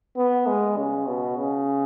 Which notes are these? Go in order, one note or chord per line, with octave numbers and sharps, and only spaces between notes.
B3
G#3
C#3
B2
C#3